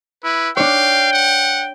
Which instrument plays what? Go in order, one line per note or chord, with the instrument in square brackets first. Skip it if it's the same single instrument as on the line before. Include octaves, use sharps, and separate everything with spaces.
[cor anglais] E4 [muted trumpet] B4
[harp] D4 C#5 [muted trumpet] F5 [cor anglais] G5
[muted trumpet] F#5